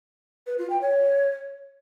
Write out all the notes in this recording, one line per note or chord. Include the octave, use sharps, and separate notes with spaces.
B4
F4
G5
C#5